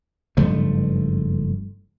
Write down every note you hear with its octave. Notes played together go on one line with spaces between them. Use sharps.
F#1 G2 F3 A3